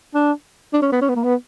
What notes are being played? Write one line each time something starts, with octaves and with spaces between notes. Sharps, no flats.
D4
D4
C#4
B3
C#4
B3
A#3
B3